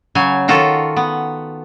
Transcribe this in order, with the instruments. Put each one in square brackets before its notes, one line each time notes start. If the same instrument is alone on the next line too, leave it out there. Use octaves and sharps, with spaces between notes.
[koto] C#3 F#3 G#5
D#3 F4 F#4 A4
B3